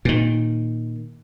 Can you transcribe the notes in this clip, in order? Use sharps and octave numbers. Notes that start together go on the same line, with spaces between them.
A#2 D#3